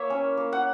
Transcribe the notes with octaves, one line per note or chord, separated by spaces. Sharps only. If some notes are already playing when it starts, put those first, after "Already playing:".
Already playing: A#3 E4 C#5 E5
C#4
A#3
F#5